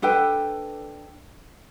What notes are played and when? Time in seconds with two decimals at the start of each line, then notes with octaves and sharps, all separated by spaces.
0.02 D4 A4 B4 G5